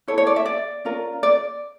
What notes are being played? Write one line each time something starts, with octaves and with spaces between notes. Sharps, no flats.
E4 A4 C#5
C#5
D5
E5
D5
C#4 F4 A#4
D5